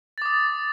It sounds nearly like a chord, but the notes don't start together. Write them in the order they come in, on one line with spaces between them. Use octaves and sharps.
A6 D6 D#6